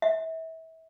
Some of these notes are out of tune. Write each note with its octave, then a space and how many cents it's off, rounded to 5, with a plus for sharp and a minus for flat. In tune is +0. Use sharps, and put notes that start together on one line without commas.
E5 -30